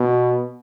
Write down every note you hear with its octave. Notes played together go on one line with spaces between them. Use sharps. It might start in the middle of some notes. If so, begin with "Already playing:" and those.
Already playing: B2